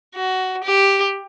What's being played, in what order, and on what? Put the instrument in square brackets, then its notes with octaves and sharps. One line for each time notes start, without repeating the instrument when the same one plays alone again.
[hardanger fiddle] F#4
G4